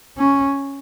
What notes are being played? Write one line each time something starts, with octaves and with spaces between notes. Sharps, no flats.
C#4